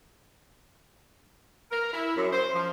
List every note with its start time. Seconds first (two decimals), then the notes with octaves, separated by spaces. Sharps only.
1.71 A#4
1.93 E4
2.16 F#2
2.33 C5
2.54 F3